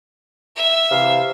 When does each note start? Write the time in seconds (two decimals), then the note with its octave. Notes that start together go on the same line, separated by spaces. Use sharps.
0.56 E5
0.90 C3 E3 F5